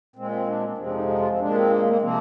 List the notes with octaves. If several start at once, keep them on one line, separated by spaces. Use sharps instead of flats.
A#2 G#3 C4
C4
D4
C4
F2 C3 F3 G#3 C4
D4
D#4
D#4
F4
C4
A#2 G#3 D4
C4
A#3
A#3
C3 F3 A#3 C4